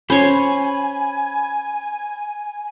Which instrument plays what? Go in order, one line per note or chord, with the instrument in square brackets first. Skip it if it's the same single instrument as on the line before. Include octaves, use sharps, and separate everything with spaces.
[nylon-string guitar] C#4 [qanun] C5 C#5 [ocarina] G#5 [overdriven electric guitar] B5